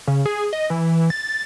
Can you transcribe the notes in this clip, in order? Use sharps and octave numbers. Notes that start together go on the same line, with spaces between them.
C#3
G#4
D#5
E3
A6